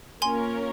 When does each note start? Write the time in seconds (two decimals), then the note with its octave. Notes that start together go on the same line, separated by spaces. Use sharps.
0.22 A#3 C#4 F4 A#4 C#5 G#5 C6